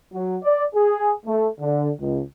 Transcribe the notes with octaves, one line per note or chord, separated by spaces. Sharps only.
F#3
D5
G#4
A3
D3
C#2